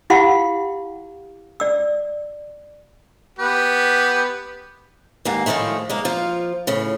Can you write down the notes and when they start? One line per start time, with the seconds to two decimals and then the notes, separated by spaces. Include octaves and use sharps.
0.10 E4 F4 G4 F5 F#5 C6
1.60 D5 E6
3.39 B3 G4 B4
5.25 D#2 G#2 A#3
5.46 A2 D#3 F3 G#3 A3
5.89 G#3 A#3
6.05 F3 F4
6.67 A2 C#3